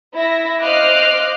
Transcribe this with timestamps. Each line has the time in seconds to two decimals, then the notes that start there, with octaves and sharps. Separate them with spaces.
0.15 E4 E5 A#6
0.63 C5 D#5 F5 D6 F6 F#6